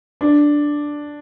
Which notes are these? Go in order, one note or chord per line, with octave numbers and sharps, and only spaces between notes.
D4